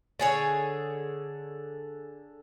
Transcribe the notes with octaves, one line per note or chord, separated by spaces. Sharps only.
D3 G#4 C#5